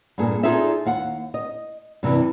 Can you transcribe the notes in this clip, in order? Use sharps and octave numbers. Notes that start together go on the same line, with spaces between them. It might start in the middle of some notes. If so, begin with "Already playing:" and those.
G2 A#2 G#4 A4
D#4 F4 G#4 A4 D5 E5
D#2 F5 F#5
D#5
G2 C3 E3 G3